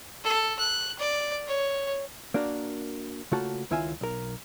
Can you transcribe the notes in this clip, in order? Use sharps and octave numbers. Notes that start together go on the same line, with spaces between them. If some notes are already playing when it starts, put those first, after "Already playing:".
A4
F#6
D5
C#5
A#3 D4 F#4 A#4
C#3 A3 A#3 F4 F#4 A5
C#2 D#3 E4 F4 E5 G#5
B1 A#4